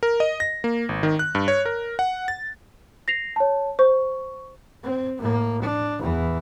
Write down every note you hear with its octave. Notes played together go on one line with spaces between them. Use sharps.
A#4
D#5
A#6
A#3
G#1
D#3
F#6
G2
C#5
A#4
F#5
A6
A#6 C7 F7
C#5 A5
C5 C#6
C4
A2 A#3
D4
E2 E3